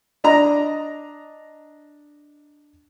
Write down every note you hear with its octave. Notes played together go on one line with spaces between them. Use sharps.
D4 D#5 A#5